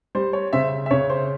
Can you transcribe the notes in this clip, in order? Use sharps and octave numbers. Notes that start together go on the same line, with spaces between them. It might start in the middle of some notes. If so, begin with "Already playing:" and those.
G3 C5
C#5
C#3 C5 E5
E5
C#3 C#5
C5